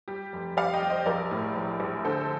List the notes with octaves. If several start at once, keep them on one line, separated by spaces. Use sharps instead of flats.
G3 G4
F1
G3 D5 F5
D#5 G5
G3
C5 D#5
A#1 A#4 D5
A2
A#1
A#1
D3 A4 C5